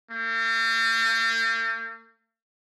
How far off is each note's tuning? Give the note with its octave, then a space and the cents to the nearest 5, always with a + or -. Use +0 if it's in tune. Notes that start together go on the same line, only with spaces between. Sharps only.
A#3 -45